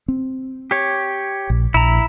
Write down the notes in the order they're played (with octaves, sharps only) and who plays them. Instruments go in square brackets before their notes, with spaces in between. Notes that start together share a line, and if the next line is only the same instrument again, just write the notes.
[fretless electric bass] C4
[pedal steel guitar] G4 C#5
[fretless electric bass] A#1
[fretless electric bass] A#1 [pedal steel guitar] E4 A#5